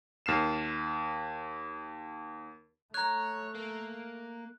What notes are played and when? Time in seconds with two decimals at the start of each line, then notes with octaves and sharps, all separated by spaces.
0.26 D#2 F6 C7 E7
2.94 A3 C#5 A#5 F#6 G#6
3.55 A#3